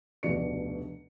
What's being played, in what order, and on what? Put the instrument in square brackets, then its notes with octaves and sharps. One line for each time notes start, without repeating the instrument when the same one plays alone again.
[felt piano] F1 D2 B2 D5 C#7